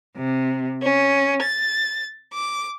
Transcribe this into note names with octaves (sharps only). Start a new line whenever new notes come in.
C3
C#4
A6
D6